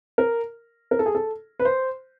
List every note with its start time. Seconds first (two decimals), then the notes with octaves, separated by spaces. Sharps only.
0.18 A#4
0.91 A#4
0.99 A4
1.06 G#4
1.15 A4
1.60 B4
1.65 C5